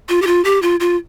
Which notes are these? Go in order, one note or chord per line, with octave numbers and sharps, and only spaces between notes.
F4
G4
F4
G4
F4
F4